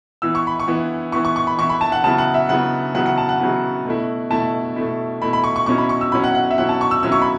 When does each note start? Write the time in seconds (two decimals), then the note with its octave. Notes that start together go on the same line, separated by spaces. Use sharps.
0.22 E3 B3 E4 E6
0.35 C#6
0.47 B5
0.60 C#6
0.68 E3 B3 E4
1.12 E3 B3 E4 C#6
1.25 C#6
1.36 C#6
1.47 B5
1.58 E3 B3 E4 C#6
1.69 B5
1.81 A5
1.92 F#5
2.04 C#3 F#3 B3 E4 A5
2.18 F#5
2.34 E5
2.49 C#3 F#3 B3 E4 F#5
2.95 C#3 F#3 B3 E4 F#5
3.06 F#5
3.18 A5
3.29 F#5
3.40 C#3 F#3 B3 E4
3.85 B2 A3 E4
4.31 B2 A3 E4 A5
4.76 B2 A3 E4
5.22 B2 A3 E4 B5
5.33 B5
5.44 C#6
5.56 C#6
5.66 B2 F#3 C#4 E4 C#6
5.78 B5
5.89 C#6
6.01 E6
6.12 B2 F#3 C#4 E4 B5
6.24 F#5
6.35 F#5
6.51 E5
6.57 B2 F#3 C#4 E4 F#5
6.69 A5
6.81 C#6
6.91 E6
7.03 B2 F#3 C#4 E4 E6
7.12 C#6
7.22 B5